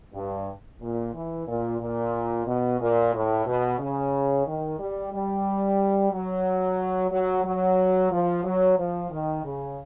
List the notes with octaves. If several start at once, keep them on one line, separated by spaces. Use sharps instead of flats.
G2
A#2
E3
A#2
A#2
B2
A#2
A2
B2
C#3
D#3
G3
G3
F#3
F#3
F#3
F3
F#3
F3
D#3
C#3